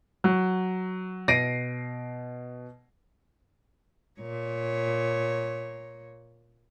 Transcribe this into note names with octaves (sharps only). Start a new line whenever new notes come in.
F#3
B2 A#6 C7 D7 D#7
A#2 C#5